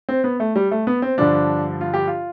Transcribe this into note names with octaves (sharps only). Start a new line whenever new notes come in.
C4
B3
A3
G3
A3
B3
C4
G2 D3 F3 D4
F4
G4
F4